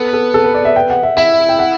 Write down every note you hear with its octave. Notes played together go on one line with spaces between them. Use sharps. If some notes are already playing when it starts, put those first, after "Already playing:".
Already playing: B3 A4
A4
A4
B4
D5
E5
G5
F#5
E5
E4 E5
G5
F#5